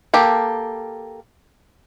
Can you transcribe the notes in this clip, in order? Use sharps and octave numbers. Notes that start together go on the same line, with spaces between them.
A#3 G4 A4